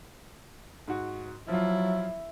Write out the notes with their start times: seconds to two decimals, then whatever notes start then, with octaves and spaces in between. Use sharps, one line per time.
0.88 G#2 F#4
1.48 F3 F#3 E4 F4